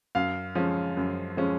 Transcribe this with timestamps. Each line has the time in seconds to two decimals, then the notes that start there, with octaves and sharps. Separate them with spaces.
0.15 F#2 F5
0.55 F3 G#3 C#4
0.97 F#2
1.37 F3 G#3 C#4